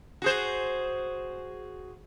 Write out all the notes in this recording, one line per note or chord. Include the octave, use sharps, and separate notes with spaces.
F#4 G#4 C5